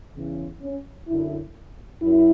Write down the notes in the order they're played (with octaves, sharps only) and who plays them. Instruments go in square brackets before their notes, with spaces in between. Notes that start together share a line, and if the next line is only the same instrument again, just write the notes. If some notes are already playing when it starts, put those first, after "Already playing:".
[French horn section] E2 C#3 E3
C#4
F#2 D3 E4
F#2 E4